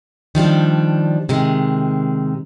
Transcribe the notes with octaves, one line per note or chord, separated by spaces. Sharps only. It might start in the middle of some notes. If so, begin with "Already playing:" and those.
D#3 F3 G3 D4
C3 D#3 G#3